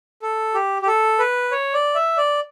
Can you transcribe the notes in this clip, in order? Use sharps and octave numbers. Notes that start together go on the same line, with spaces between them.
A4
G4
G4
A4
B4
C#5
D5
E5
D5